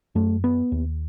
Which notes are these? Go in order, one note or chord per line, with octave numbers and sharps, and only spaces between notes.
F#2 A3
B3
D#2